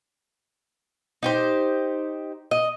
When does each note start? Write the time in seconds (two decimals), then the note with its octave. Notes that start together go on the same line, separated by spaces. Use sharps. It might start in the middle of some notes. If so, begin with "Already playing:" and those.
1.23 D#4 G4 C5
2.51 D#5